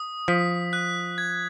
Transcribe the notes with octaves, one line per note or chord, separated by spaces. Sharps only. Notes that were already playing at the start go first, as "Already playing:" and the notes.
Already playing: D#6
F3 B6
F#6
G#6